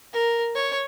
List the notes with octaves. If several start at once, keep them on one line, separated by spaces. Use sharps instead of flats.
A#4
C#5